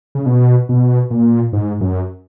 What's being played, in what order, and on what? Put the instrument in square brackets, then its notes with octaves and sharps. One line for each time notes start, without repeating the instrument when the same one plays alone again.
[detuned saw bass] C#3
B2
B2
A#2
G#2
F#2